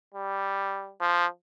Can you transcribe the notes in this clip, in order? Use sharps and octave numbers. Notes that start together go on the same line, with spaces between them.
G3
F3